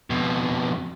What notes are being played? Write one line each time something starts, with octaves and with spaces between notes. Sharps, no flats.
F2 B2